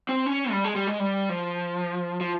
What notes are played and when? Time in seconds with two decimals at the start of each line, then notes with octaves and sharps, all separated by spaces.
0.09 C4
0.26 C#4
0.51 G3
0.64 G#3
0.76 G3
0.87 G#3
0.99 G3
1.29 F3
2.21 F3